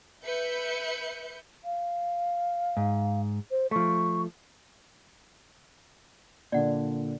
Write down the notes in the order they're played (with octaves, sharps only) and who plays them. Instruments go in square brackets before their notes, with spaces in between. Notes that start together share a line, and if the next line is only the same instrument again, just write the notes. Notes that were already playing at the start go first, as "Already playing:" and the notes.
[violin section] B4 E5 G6 C#7
[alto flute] F5
[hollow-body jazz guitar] G#2
[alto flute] C5
[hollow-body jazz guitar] F3 A3 [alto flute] C#6
[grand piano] A#2 D3 [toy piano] D5 F#5